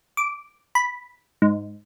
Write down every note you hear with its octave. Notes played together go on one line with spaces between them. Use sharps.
D6
B5
G#2